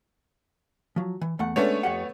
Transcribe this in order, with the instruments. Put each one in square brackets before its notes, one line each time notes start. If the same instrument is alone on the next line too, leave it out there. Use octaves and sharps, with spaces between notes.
[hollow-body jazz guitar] F3 F#3
E3
E2 A3 F#5
[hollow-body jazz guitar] G#3 C#4 D4 [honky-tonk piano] A3 B3 C#5
[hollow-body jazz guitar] F2 G4 F#5